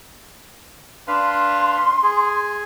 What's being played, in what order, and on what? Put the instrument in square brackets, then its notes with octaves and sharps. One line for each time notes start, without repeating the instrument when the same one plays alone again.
[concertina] D4 B4 F5 [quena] C6
[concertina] G#4